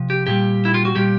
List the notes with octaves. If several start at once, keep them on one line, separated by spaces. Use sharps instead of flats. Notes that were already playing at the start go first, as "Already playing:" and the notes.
Already playing: C3 F3
G4
A#2 G3 G4
E4
F4
F#4
A#2 G3 G4